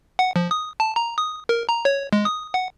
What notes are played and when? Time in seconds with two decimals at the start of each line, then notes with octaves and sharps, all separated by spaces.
0.19 F#5
0.36 F3
0.51 D#6
0.80 A5
0.96 A#5
1.18 D#6
1.49 A#4
1.69 A#5
1.85 C#5
2.13 G#3
2.25 D#6
2.54 F#5